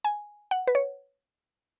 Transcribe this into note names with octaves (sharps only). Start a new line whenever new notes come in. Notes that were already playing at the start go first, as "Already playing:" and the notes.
G#5
F#5
B4
C#5